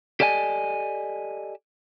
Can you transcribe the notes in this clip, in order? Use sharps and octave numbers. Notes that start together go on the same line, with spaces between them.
G4 A4 D5 D#5 G#5